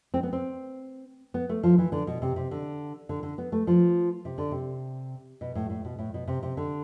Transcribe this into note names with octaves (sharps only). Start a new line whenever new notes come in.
C4
B3
C4
B3
A3
F3
E3
D3
B2
C3
C3
D3
D3
D3
B3
A3
F3
C3
D3
C3
B2
A2
A2
B2
A2
B2
C3
C3
D3